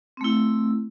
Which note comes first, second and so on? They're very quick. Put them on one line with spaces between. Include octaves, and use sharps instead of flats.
C4 A3 E4